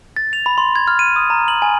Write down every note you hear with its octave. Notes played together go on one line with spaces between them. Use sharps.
A6
F7
B5
C6
G#6
F6
D#7
D#6
A#5
F#7
G#5